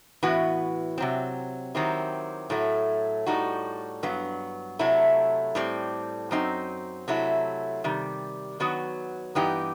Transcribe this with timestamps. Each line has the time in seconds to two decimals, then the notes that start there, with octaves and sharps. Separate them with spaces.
0.23 A2 E3 B3 F#4
0.98 C3 F#3 C4
1.74 D#3 F#3 C4 E4 G4
2.50 A2 F#3 A3
3.26 A2 G3 D#4 F#4
4.03 G2 F#3 B3
4.79 C3 F#3 A3 E4
5.55 A2 G3 C4
6.31 F#2 F#3 C4 D#4
7.08 C3 F#3 A3 E4
7.84 C3 D#3 G3
8.60 D#3 F#3 B3 F#4
9.35 G2 E3 B3 D#4 G4